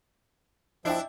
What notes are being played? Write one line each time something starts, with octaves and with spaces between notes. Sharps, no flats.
F3 D4 E4 D#5 E5 G5